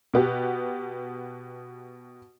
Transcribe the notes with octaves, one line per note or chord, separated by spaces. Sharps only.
B2 B3 G4